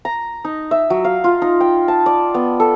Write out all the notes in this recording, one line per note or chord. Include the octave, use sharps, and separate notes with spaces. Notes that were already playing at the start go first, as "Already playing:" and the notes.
A#5
D#4
E5
F#3
F5
F4
D#4
G5
A5
D5
B3
A4